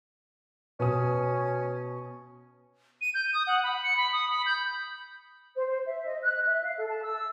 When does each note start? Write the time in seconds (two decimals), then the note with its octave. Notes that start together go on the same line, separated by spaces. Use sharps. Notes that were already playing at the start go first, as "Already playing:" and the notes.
0.80 B2 C#4 D#6
3.01 D#7
3.14 G6
3.34 D#6
3.47 F#5
3.64 B5
3.83 C#7
3.97 B5
4.12 D#6
4.29 B5
4.46 G6
5.55 C5
5.66 C5
5.86 E5
6.06 D#5
6.23 F#6
6.47 E5
6.63 F5
6.78 A4
6.89 A5
7.04 E6